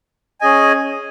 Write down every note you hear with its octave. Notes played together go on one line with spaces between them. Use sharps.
C#4 G#4 D#5 G#5